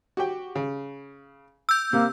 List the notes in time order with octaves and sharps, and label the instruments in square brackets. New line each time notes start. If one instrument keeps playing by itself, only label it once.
[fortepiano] F#4 G4 G5
C#3
[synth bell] E6 G6
[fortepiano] C3 [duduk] A#3